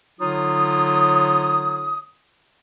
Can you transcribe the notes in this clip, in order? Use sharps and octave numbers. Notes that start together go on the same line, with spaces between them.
D3 F#3 D#4 F4 C#5 D#6